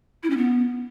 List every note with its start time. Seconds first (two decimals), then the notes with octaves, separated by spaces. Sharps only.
0.23 E4
0.30 C#4
0.37 B3